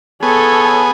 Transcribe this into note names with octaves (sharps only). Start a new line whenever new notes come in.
B3 G#4 A4 C#5